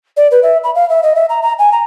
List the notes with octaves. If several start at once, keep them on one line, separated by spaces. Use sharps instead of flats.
D5
B4
E5
B5
F5
E5
D#5
E5
A#5
A#5
G#5
A#5